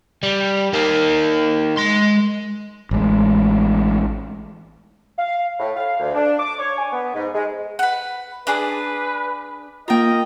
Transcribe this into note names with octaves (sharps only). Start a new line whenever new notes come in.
G3
A#3 D#4
G#3 C6
A1 G#3
F5
A2
F5
D2
D4
D6
C#5
G#5
B3
G#2
G#3
B4 F#5
D4 G#4 B4 D5
A#3 F4 A#4 D#5 G5